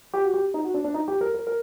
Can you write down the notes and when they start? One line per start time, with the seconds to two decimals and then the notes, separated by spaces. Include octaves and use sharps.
0.14 G4
0.24 F#4
0.34 G4
0.54 D#4
0.64 F#4
0.74 D4
0.84 D4
0.94 D#4
1.08 G4
1.21 A#4
1.34 A#4
1.47 A#4